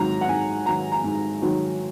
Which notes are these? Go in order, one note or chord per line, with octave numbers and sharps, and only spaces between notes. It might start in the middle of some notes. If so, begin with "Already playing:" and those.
Already playing: G#2 D#3 F#3 A#5
F#5
G#2 G#5
D#3 F#3 A#5
A#5
G#2
D#3 F#3